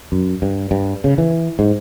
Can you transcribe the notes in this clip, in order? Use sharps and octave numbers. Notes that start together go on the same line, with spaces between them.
F#2
G2
G2
C#3
E3
G#2